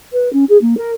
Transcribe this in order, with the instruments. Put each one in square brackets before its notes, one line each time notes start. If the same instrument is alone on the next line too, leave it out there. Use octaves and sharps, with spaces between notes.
[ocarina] B4
C#4
G#4
A#3
A#4